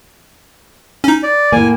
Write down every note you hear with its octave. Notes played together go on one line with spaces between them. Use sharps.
C#4 D#4
D5
A2 A#3 G#5